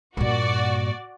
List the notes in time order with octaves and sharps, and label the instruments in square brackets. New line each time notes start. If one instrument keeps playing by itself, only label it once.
[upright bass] G2 A#2 [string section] F#4 D5